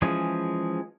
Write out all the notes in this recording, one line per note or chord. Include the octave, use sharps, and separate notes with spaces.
E3 F3 G#3 C#4 G#4